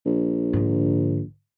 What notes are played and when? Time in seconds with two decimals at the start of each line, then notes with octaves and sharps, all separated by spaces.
0.06 A#1
0.53 G#2 D3